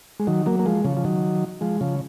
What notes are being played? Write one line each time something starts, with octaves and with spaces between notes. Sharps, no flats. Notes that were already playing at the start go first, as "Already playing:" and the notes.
G#3
D#3 F#3
F#3 A#3
A#3
F3 G#3
C#3 F3
F3
D#3 F#3
F3 G#3
C#3 F3